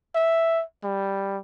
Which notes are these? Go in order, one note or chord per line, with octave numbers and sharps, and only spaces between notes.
E5
G3